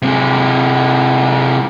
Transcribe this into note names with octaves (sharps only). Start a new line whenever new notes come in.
C3 G#3